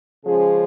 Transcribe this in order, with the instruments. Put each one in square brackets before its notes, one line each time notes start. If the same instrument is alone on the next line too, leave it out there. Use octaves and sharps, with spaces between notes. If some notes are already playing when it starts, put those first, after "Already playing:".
[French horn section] C#3 F3 G#3 C#4 G#4